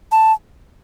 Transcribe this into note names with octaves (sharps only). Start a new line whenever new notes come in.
A5